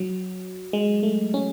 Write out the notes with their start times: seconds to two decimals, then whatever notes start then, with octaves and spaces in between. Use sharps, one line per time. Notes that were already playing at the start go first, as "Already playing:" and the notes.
Already playing: F#3
0.73 G#3
1.03 A3
1.34 C#4